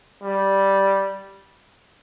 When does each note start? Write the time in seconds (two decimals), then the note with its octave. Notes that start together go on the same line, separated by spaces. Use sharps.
0.22 G3